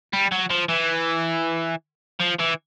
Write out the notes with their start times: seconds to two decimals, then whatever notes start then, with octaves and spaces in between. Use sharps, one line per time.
0.13 G3
0.32 F#3
0.51 F3
0.69 E3
2.20 F3
2.40 E3